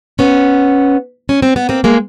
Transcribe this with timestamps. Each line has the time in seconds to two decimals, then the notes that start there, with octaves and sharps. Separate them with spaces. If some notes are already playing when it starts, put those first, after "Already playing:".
0.19 B3 C#4
1.29 C#4
1.42 C4
1.56 B3
1.69 A#3 C4
1.84 G#3 A#3